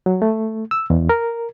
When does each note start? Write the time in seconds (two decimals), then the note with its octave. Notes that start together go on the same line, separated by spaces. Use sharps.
0.06 F#3
0.22 A3
0.71 E6
0.90 E2
1.09 A#4